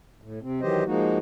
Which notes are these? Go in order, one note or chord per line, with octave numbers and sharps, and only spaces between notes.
A2
C3 C4
D#3 E3 F#3 G4 C5 D#5
F3 G#3 A#3 D#4 F#4